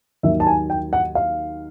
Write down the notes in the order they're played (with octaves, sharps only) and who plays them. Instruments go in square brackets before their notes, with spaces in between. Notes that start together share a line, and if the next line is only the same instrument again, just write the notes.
[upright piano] D#2 D#3 F#3 E5
A5
G#5
G5
F#5
F5